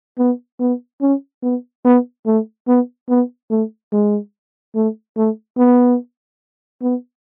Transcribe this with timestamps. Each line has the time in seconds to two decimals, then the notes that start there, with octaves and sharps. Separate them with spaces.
0.19 B3
0.60 B3
1.02 C#4
1.43 B3
1.85 B3
2.26 A3
2.68 B3
3.09 B3
3.51 A3
3.93 G#3
4.75 A3
5.17 A3
5.58 B3
6.82 B3